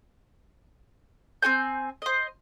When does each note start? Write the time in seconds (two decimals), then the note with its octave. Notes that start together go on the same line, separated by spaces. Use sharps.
1.42 C4 F#4 G#5 G6
2.02 C5 D#5